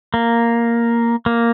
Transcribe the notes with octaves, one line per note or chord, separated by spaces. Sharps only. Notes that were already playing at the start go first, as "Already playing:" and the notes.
A#3
A#3